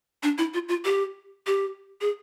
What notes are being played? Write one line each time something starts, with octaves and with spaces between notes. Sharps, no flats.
D4
E4
F4
F4
G4
G4
G#4